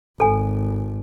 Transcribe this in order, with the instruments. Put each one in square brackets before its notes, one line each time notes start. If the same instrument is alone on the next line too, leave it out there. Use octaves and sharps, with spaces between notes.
[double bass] G#1 [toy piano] A4 G#5